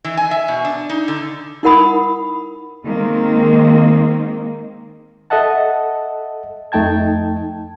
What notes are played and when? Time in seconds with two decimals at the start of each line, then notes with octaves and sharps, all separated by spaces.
0.04 E3
0.17 G#5
0.31 E5
0.48 B2
0.65 D4
0.89 D#4
1.08 D3
1.63 D#4 E4 A#4 F#5 B5 D#6
2.85 D#3 G#3 A#3 C4
5.30 A4 D#5 E5 F#5 A5
6.72 F2 A3 D#4 G5 A5 G#6